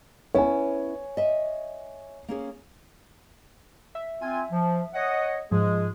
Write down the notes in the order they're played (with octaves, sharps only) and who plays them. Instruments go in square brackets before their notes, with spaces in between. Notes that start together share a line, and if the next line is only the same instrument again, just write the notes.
[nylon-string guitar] B3 C#4 E4 [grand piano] C#5 G#5
[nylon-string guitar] D#5 E5
A#3 C#4 G#4
[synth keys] E5
[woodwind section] C4 F4 G#5
F3
C#5 D#5 F#5
[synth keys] G#2 F3 [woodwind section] G#3 G#4